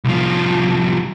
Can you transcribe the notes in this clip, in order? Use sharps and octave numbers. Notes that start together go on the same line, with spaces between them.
C2 F3